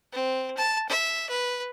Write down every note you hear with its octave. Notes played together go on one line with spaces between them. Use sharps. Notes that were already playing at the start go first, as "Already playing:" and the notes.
C4
A5
E5
B4